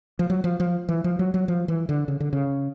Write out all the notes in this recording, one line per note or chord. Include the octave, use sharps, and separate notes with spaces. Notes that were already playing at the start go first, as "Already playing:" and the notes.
F3
F#3
F3
F3
E3
F3
F#3
F#3
F3
E3
D3
C#3
D3
C#3